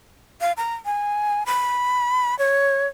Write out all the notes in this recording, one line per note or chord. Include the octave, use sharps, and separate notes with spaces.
F5
A#5
G#5
B5
C#5